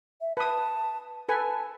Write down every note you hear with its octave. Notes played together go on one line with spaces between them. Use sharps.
E5
B4 A5 D#6
A4 B4 G#5 A5